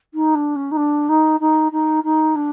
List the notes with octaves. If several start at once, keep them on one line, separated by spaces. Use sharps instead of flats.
D#4
D4
C#4
D#4
D4
D#4
D#4
D#4
D#4
D4